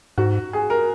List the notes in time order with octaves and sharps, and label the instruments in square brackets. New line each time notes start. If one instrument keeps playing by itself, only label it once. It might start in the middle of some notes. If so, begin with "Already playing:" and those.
[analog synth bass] G#2 [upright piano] F#4
[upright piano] G#4
A#4